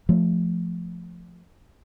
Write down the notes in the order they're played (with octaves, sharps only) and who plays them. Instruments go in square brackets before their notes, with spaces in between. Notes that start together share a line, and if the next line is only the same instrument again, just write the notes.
[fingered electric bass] F3 A3